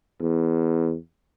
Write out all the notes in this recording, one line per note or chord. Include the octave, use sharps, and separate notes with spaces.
E2